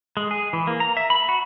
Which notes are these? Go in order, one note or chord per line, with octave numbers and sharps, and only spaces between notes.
G#3
G#4
E3
A#3
A#5
E5
B5
F#4